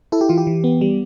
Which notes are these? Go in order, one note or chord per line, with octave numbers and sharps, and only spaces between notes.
E4 A4
G4
E3 F4
G4
E3
B3
G3